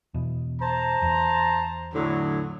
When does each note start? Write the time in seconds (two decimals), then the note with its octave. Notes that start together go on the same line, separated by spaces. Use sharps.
0.14 E2 B2
0.61 C5 A5 A#5
1.02 E2
1.94 A2 D3 F#3